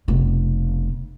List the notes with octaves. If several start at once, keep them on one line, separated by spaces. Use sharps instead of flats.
F1 B2